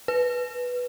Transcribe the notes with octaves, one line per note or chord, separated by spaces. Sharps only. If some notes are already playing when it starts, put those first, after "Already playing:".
B4